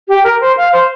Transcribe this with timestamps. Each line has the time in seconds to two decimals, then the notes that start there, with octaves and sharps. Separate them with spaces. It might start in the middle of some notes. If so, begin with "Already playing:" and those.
0.09 G4
0.24 A#4
0.41 C5
0.57 F5
0.73 C5